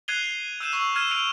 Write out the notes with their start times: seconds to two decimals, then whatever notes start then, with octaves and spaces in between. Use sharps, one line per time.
0.08 F#6 G#6 C7 D#7 F7 G7
0.23 C7
0.60 E6 G6 D#7 E7
0.72 C#6 E6 D#7 F7
0.95 F6 G#6 D#7 E7
1.11 F6 D7 D#7 F7